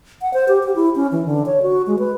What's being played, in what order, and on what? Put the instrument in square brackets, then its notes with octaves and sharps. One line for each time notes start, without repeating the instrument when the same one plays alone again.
[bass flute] F#5
C5
G4
G4
E4
C#4
E3
D3
C#5
F#4
G#3
B4